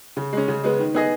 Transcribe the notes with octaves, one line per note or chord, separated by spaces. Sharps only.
C#3
G#3 C#4
C#3
G#3 B3
D#3
B3 G#4 D#5